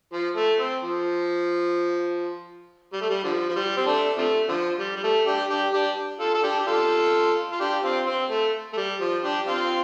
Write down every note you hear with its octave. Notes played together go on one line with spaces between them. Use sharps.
F3
A3
C4
F3
G3
A3
G3
D3 F3
F3
G3
C4
A3 D4
C3 F3 A3
D3 F3
G3
G3
A3
D4 G4
D4 G4
D4 G4
F4 A4
A4
D4 G4
G4
F4 A4
F4
D4 G4
C4 F4
C4
A3
A3
G3
F3
D4 G4
C4 F4